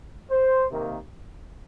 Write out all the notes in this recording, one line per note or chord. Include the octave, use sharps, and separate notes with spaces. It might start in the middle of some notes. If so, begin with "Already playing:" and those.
C5
C3 D#3 A#3